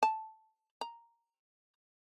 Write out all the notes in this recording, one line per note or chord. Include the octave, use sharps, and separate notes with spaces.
A5
A#5